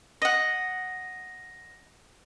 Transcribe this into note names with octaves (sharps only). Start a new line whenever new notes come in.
D#5 F#5 A#6